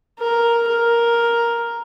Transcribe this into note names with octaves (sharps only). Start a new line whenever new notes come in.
A#4
A#4